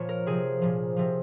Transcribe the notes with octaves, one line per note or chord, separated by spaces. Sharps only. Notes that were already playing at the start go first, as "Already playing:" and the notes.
Already playing: A#2 F3 C#5
A#4
C3 F3 G#4
A#2 F3
C3 F3